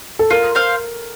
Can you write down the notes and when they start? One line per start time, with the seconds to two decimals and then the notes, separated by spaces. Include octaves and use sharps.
0.19 A4
0.30 F4 A#4
0.55 C5 F5